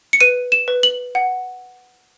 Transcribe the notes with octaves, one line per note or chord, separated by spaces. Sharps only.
C#7
B4 D#7
E7
B4
F#7
F#5